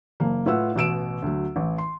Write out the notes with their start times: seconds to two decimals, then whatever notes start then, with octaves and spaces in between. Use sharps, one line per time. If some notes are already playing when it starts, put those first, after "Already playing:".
0.20 F#1 A#3
0.46 A2 F4 B4 F#5 E6
0.75 A1 B2 E6 D7 E7
1.22 D2 F#3
1.56 A1
1.78 C6